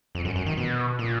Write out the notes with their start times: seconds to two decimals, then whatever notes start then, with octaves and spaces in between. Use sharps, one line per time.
0.15 F2
0.25 F#2
0.36 F#2
0.46 D#3
0.57 B2
0.99 A#2